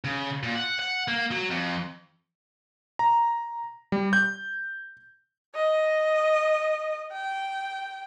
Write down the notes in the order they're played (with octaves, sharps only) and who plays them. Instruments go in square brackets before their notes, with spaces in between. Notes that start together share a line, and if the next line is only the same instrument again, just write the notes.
[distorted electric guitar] C#3
A#2
F#5
F#5
A#3
F#3
F2
[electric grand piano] A#5
G3
G6
[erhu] D#5
G5